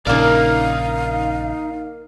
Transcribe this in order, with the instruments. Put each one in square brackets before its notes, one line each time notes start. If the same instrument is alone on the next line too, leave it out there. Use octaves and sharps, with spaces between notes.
[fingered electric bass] A#1 C#3 [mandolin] A#3 A#4 [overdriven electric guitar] D#4 D5 [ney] F5